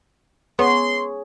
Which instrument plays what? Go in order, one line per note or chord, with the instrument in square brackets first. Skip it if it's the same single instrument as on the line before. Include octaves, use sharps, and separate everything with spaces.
[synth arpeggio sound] B3 [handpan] G#4 C#5 [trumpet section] C6